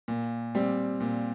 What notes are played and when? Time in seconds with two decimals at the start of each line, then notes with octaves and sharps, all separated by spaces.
0.08 A#2
0.55 G3 C4
1.00 A#2